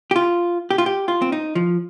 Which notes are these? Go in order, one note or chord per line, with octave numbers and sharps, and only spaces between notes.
G4
F4
G4
F4
G4
F4
C4
D#4
F3